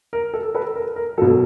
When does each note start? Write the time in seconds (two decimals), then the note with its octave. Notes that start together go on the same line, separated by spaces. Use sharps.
0.13 A#4
0.34 A4
0.55 A4 B4
0.76 A#4
0.96 A#4
1.18 F#3 A4
1.22 B2